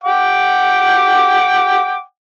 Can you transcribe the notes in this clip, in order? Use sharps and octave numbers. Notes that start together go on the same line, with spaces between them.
F#5 G5 D6